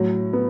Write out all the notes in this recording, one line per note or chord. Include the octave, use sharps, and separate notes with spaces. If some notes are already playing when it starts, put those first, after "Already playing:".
Already playing: A2 F#3
B3